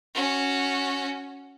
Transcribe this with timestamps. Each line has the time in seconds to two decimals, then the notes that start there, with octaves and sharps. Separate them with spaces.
0.15 C#4 F#4